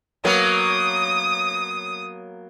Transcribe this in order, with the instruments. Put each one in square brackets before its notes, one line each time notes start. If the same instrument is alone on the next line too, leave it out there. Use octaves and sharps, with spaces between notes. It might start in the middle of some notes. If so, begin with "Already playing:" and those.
[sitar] F#3 A#3 B3 [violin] D#6